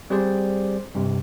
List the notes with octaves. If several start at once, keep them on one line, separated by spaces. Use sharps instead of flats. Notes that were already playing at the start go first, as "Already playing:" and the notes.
G3 C4 G4 G#4 C5 D5
G2 C3